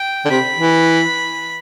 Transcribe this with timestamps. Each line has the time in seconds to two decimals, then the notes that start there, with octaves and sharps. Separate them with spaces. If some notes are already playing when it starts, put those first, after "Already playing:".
Already playing: G5
0.25 D3
0.30 C3 B5
0.58 E3